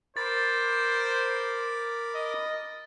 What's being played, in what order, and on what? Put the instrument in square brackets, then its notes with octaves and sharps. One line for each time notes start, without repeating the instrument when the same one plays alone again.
[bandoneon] A#4 B5 D6 [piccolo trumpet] C5 [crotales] A6
[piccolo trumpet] D#5